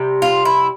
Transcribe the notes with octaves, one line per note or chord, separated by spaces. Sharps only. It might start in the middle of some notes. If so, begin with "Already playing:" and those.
Already playing: C3 G3
F4
E4